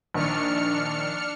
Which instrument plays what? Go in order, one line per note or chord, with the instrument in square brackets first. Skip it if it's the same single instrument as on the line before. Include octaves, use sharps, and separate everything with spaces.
[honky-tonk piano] A#1 D#3 [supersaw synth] D4 F6 C#7